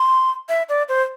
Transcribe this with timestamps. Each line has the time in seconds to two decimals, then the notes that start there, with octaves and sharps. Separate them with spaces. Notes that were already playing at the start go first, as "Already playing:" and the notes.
Already playing: C6
0.49 E5
0.69 D5
0.89 C5